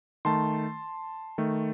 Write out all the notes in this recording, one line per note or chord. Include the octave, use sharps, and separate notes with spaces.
D#3 A3 A5 C6
D#3 A3